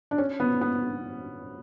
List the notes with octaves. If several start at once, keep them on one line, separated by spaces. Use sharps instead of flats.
D4
C#4
B3
B3